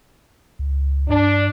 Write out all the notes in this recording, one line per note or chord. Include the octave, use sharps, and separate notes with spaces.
C#2
G2 D4